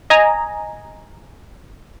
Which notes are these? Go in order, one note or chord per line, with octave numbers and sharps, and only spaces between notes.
D#5 G#5 A#5